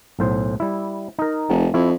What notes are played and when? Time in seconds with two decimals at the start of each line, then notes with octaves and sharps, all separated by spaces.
0.19 B1 A2 C5
0.60 G3 E4
1.18 D#4 A#4
1.49 F1
1.74 F2 E4